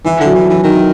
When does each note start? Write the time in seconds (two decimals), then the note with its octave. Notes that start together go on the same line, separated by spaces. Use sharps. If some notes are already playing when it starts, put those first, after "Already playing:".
0.05 E3 E4
0.20 D3 F#3
0.35 E3
0.44 F#3
0.50 E3
0.64 D#3 F#3